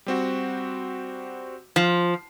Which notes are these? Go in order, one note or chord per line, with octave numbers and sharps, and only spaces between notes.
G3 C4 F#4
F3